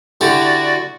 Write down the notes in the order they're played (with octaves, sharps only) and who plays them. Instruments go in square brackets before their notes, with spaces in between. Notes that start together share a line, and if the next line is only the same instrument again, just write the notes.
[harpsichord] D3 E4 G4 [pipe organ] F#4 D5